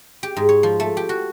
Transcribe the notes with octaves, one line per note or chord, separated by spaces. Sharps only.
G4
G#2
C#5
F3
A3
G4
F#4